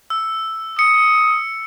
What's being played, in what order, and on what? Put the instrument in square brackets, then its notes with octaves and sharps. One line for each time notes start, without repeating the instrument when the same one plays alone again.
[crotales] E6
[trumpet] D#6 [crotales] C#7